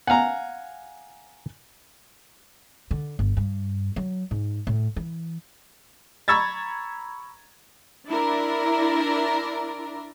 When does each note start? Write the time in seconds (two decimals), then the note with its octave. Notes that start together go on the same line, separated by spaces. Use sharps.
0.07 F5 F#5 G#5 A#5
2.91 D3
3.19 G1
3.37 G2
3.96 F#3
4.31 G#2
4.67 A2
4.96 E3
6.28 A#5 B5 C#6 E6 G#6 A6
8.09 D4 E4 A#4 D5 A#5